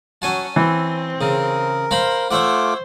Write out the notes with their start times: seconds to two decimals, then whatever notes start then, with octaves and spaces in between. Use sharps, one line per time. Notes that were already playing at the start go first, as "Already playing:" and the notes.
0.22 F#3 C#4 G#5 A5
0.56 E3 C4
1.21 C#3 A#4
1.91 C5 F5 A#5 B5
2.31 A3 F4 C5 C#5 E5 F#5 D6